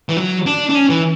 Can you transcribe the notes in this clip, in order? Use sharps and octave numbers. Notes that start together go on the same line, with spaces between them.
E3
F#3
D4
D4
C#4
E3